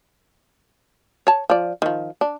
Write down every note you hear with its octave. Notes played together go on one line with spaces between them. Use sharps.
C#5 A5
F3 D5
D#3 F3
D4